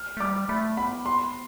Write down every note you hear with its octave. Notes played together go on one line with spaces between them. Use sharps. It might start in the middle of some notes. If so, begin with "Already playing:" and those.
Already playing: F6
A3
G3 D6
A3 B5
B3 B5
C6